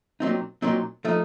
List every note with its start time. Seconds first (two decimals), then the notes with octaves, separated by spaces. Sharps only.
0.20 A#2 F#3 C4 D#4
0.62 A#2 F#3 C4 D#4
1.05 F3 A3 D#4